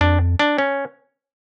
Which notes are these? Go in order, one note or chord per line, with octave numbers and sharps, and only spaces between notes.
F2 D4
D4
C#4